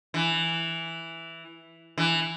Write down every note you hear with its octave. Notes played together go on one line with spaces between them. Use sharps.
E3
E3